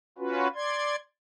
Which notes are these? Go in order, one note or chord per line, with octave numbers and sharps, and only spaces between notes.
C#4 F4 F#4 B4
D5 C6 G#6